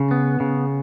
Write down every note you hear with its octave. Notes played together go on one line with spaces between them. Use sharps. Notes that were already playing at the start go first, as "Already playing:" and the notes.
Already playing: C#3
B3
C#3